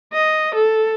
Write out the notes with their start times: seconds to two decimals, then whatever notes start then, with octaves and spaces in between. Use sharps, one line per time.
0.13 D#5
0.55 A4